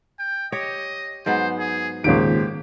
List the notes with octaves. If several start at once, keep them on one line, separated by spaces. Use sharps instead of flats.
G5
G4 C#5 D#5
G#2 F#3 B3 C5
G#4
G#1 D#2 A#2 C#3 G4 D7